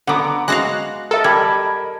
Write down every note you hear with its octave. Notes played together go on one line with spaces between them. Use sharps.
D3 B3 F#5 A#5 D6
G#3 F#4 F5 F#6 A#6
A4 A#4 D#5
G3 A5 B5 G#6